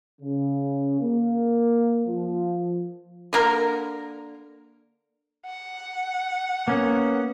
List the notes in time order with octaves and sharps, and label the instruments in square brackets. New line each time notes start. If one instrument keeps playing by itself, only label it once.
[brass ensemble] C#3
A#3
F3
[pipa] D3 A#3 A#4
[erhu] F#5
[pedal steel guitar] A#3 B3 C#4